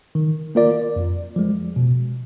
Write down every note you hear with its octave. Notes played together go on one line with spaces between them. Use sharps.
D#3
A#3 F4 A#4 D5
F2
F3 G#3
B2